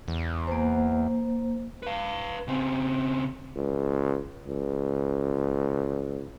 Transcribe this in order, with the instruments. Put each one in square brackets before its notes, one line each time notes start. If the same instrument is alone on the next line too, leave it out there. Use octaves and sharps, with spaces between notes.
[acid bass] E2
[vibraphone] A#3 C5
[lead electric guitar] B4 F5
C#3 C4
[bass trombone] C#2
C#2